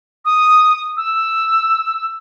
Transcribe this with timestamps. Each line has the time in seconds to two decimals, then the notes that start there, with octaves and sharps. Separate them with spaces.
0.25 D#6
0.97 E6